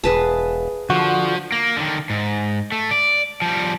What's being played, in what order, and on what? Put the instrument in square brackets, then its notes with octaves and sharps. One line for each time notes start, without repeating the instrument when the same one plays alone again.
[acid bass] E1 [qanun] G#4 B4 A5
[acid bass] D3 [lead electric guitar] F3 [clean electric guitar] F#4
[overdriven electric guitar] A#3
D3 D#3
G#2
A3
D5
F3 G3